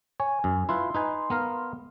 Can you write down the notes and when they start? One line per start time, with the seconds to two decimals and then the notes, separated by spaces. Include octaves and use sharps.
0.20 C#5 G#5
0.44 F#2
0.69 E4 F4 B4 C6
0.95 D#4 B4 G#5
1.30 B3 A#4 F5